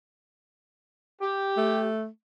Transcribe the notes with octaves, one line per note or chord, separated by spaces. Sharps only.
G4
A3